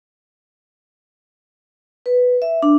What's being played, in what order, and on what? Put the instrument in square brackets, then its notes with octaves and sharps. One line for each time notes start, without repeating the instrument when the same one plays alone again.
[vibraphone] B4
E5
D4